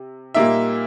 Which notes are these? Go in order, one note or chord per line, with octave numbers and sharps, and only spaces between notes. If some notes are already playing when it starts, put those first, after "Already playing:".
Already playing: C3
A#2 G3 A#3 D#4 E5